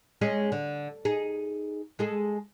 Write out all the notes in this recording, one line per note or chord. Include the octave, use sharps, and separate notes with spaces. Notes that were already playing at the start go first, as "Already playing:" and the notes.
G#3 C#4 G#4
D3
D#4 G#4
G#3 G#4 A4